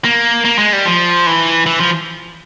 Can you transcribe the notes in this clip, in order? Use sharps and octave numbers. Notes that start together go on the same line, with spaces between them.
A#3
A#3
G#3
G3
F3
E3
E3
F3